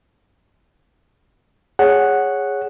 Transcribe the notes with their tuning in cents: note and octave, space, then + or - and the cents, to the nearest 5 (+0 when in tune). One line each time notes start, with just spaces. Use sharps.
G#4 -10 C#5 +0 F#5 +0